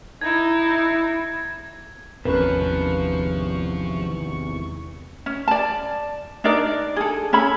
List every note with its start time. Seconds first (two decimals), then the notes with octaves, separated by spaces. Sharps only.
0.21 D#4 E4 G#6
2.25 G#1 E2 C3 F3 C#4 A#4 B4 C#6
5.26 C#4
5.48 D5 A5
6.44 D4 D#4 A#4 D5
6.96 G#4 A4
7.33 C#4 G#4 A4 B5